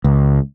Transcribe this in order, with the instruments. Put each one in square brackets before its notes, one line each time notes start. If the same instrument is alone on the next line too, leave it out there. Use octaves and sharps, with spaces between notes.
[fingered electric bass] C#2